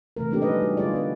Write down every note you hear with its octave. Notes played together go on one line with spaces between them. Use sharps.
C3 E3 A3 A#4
G#3 A#3 C4 D4 G4 A4
F3 G3 C#4 D#4 B4 D#5
G3 F#4
D3 G#3 F4 G#4 D5
B3 B4